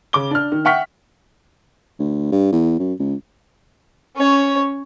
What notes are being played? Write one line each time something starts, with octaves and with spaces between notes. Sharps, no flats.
C#3 D6 G7
D4 F6
D#3
E5 F#5 G5 C#6 F6 B6
D2
G2
E2
F#2
C#2
C#4 C#5